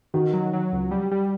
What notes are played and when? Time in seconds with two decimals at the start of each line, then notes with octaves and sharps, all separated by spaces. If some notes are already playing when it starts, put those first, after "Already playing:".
0.14 D#3 F#4
0.33 F#3
0.53 F#3
0.72 C#2
0.91 G3
1.11 G3